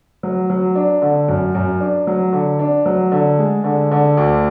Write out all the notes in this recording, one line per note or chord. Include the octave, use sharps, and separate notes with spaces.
F#3
F#3
D4
D3
F#2
F#2
D4
F#3
D3
D4
F#3
D3
G#3
D3
D3
D2